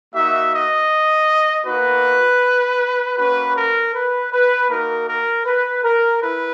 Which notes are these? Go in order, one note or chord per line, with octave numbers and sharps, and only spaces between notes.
A#3 D#4 F#4 E5
D#5
A#3 D#4 F#4 B4
A#3 C#4 F#4 B4
A#4
B4
B4
A#3 D#4 F#4 A#4
A#4
B4
A#4
E4 B4